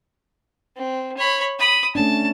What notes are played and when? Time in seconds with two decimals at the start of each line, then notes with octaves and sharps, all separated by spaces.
0.77 C4
1.17 C#5 B5
1.59 B5 D#6
1.95 A3 C#4 D4 A5